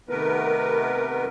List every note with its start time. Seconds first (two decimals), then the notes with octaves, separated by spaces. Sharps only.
0.09 C3 D#3 A3 B3 A#4 B4